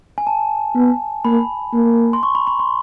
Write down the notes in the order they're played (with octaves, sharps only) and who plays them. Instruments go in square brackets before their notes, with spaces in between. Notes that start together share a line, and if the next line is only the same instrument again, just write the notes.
[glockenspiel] G#5
A5
[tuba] B3
[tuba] A#3 [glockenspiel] B5
[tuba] A#3
[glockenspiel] C6
C#6
B5
B5
C6